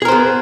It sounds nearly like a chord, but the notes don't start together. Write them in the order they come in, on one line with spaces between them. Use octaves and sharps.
G#4 A#4 C5 B3